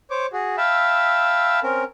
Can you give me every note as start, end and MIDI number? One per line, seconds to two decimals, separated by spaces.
0.11 0.26 72
0.11 0.26 73
0.11 0.26 86
0.33 0.56 66
0.33 0.56 68
0.58 1.60 76
0.58 1.60 77
0.58 1.60 79
0.58 1.60 81
0.58 1.60 83
0.58 1.60 88
1.63 1.84 60
1.63 1.84 61
1.63 1.84 70